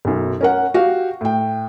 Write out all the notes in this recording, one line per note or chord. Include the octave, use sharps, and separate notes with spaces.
B1 F#2
C#4 A#4 F#5
F#4 G4 F5
A2 G5